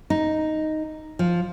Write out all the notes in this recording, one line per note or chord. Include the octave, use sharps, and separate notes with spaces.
D#4
F3